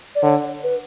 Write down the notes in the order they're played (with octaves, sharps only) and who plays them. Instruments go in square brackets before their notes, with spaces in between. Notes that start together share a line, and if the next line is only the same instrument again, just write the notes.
[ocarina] D5
[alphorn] D3 [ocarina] C#5
[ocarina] B4